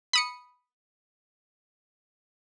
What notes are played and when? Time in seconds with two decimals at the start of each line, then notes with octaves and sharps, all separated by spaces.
0.13 B5 D#6 C#7